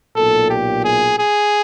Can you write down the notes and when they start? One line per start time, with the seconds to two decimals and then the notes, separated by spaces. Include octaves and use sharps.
0.17 B1 A#2 A4
0.51 G4
0.85 G#4
1.20 G#4